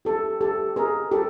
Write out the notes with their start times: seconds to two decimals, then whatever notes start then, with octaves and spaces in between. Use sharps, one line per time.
0.05 G4 A4
0.41 G4 A4
0.76 G#4 A#4
1.11 G4 A4